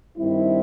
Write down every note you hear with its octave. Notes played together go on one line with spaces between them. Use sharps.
G2 D#3 G3 C4 E4